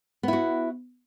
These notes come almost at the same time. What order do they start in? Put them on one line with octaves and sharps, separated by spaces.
B3 E4 F#4